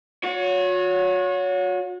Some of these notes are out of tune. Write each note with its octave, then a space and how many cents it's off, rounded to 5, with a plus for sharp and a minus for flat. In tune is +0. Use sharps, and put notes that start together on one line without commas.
F#4 -35 C#5 +20